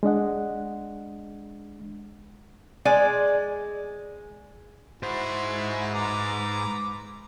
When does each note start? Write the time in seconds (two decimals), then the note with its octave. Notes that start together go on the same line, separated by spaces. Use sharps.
0.03 G#3 D4 D#5 F#5
2.85 G#3 C5 D5 G#5
5.03 G#2 E4 F#4 C5
5.94 B4 A#5 D6